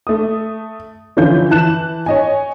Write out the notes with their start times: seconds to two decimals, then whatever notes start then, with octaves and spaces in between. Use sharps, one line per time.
0.07 A3 D#6
1.17 D3 E3 F3 C#4 F4 G6
1.51 E3 A5 F#6 E7
2.06 C#5 D#5 G#5